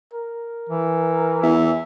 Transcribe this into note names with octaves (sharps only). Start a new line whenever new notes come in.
A#4
E3
E2 E5